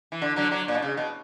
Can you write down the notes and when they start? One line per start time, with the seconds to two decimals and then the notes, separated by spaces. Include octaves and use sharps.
0.12 E3
0.22 D3
0.36 D3 F#3
0.51 D3 F#3
0.68 A#2
0.74 B2
0.82 C#3
0.97 B2